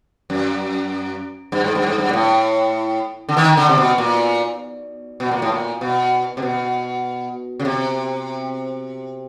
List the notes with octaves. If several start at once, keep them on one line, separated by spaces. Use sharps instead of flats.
F#2
G2
G#2
G2
G#2
G2
A#2
A2
D3
D#3
D3
C3
B2
A#2
B2
A#2
A2
A#2
B2
C3
B2
C#3
C3